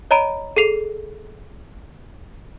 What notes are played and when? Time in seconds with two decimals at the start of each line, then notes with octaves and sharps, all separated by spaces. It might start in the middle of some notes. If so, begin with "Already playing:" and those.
0.11 C#5 D#5 A#5 B5 D7 D#7
0.56 G#4 A4 C7 F7